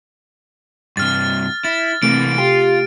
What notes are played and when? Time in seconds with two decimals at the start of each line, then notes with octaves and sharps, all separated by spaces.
0.97 G2 C3 F6 A6
1.64 E4 A6
2.03 C3 E3 A3 A#3 D7
2.38 F4 G4